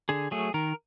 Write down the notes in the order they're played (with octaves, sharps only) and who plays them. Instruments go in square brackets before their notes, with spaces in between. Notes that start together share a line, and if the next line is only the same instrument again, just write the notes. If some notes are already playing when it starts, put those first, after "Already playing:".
[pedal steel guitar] D3 G#4
F#3 A3 G#4
D#3 A#4